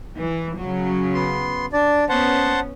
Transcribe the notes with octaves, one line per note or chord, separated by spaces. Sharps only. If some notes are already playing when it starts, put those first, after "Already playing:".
E3
C#3 F#3
B3 C6
D4 D5
B3 C#4 C5 F#5 A5